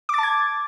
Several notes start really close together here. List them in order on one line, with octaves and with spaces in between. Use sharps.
D6 A6 A5 G#6